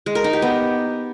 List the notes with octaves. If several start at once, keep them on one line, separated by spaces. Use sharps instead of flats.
G#3
A#4
D#4
G4
B3